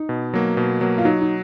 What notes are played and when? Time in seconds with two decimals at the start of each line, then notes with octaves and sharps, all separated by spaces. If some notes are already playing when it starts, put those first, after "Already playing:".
Already playing: D#4
0.09 B2
0.34 F#3 A#3
0.57 B2
0.81 F#3 A#3
0.98 F4
1.05 F#3 D#4
1.21 D#4